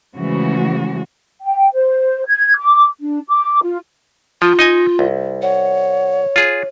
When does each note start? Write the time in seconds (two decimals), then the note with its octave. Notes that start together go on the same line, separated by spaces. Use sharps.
0.17 C#3 E3 F3 G#3 A3 F#4
1.42 G5
1.73 C5
2.28 G#6
2.57 D6
3.00 D4
3.29 D6
3.63 F4
4.42 F3 F4
4.59 D#4 D#5 G#5
4.99 C2
5.42 C#5 F#5
6.36 F4 G#4